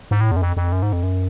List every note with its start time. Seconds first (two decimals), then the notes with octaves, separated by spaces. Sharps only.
0.11 G#2
0.21 A2
0.31 E2
0.36 F#2
0.42 F2
0.57 F2
0.72 F#2
0.82 G#2
0.93 F2
1.03 F#2